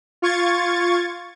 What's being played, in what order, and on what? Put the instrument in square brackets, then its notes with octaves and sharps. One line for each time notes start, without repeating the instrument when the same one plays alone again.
[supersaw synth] F4 C#6 G#6 A6